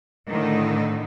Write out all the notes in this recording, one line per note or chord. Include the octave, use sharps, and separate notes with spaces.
A2 D3 D#3 D#4